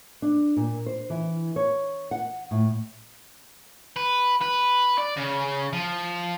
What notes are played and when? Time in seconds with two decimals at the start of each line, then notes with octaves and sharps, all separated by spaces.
0.22 D4
0.57 A#2
0.86 C5
1.10 E3
1.56 C#5
2.11 F#5
2.51 A2
3.96 B4
4.42 B4
4.98 D5
5.16 C#3
5.73 F3